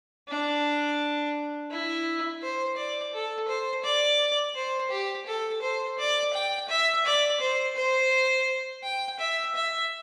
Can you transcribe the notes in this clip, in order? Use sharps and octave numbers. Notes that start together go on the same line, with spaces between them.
D4
E4
C5
D5
A4
C5
D5
C5
G4
A4
C5
D5
G5
E5
D5
C5
C5
G5
E5
E5